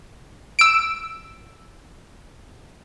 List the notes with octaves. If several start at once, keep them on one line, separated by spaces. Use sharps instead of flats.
E6 D7